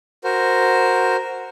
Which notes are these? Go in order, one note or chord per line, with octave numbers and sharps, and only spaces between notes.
F#4 A#4 C5